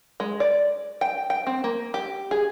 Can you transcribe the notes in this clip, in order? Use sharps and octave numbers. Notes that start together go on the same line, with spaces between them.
G#3
D5
G5
G5
C4
A#3
G4
G#4